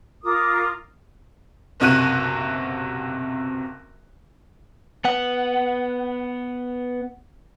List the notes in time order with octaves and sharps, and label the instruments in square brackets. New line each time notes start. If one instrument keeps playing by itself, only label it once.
[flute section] F4 A#4 D6 D#6
[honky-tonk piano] F#1 B1 C3 F#4 F#6 D#7
[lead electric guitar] B3 F#5